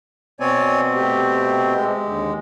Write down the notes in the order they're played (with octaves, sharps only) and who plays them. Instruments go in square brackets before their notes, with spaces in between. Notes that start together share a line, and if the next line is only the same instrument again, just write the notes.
[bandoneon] B2 C4 [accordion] C#5 D5 G#5
[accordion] A3 G4
[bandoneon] G#3
[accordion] D#2 D3